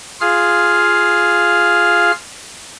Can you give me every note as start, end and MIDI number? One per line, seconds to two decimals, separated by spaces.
0.21 2.12 65
0.21 2.12 68
0.21 2.12 77
0.21 2.12 89